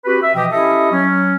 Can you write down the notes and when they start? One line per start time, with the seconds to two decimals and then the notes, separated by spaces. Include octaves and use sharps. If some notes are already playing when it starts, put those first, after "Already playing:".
0.05 C4 F#4 G4 B4
0.21 E5
0.35 B2 E3 F3 G4 D#5 G5
0.51 C#4 E4 G4 A4 D#5 E5
0.91 F#3 C#4